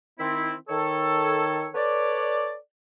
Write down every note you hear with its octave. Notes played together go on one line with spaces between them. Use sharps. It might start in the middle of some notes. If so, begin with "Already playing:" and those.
D#3 C4 E4
D#3 A4 C#5
A4 B4 C#5 D5